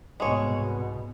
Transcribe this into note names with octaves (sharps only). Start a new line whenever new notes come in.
C2 G#2 B2 G#3 C#5